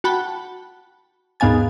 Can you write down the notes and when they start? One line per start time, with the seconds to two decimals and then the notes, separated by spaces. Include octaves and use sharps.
0.04 F#4 F#5 G5 A5 B5
1.40 D#2 G#2 B3 F5 G#5 A6